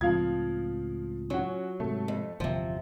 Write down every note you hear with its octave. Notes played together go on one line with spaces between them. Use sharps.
C#2 A2 F3 C4 F4 F5 D#6 G#6
F#3 C#4 F#4
G#2 C3 A3
F2
G1 E2 C3 F3